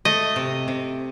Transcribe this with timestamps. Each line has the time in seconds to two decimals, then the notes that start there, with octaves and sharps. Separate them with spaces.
0.05 A3 D#5
0.36 C3
0.68 C3